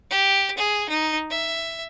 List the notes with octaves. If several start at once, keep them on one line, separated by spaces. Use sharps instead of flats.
G4
G#4
D#4
E5